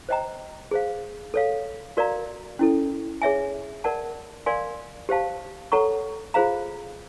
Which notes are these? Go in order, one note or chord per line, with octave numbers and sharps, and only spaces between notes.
C5 D#5 G5 A#5
G#4 C5 F5
A4 C#5 F5
F#4 A#4 D5 F5 A#5
C#4 E4 A4
G#4 C#5 E5 G#5
A#4 D5 F#5 A5
A#4 D5 F5 G#5 C6
G4 C5 F5 A5
A4 C#5 F#5 A#5 C#6
F4 G#4 C5 F5 A#5